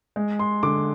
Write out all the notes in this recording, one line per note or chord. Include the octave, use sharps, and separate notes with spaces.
G#3
C6
D3 D6